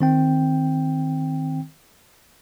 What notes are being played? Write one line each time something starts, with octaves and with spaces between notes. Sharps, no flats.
D#3 C4 G5